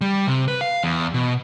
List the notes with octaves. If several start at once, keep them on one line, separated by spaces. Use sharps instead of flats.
G3
C3
B4
F5
E2
B2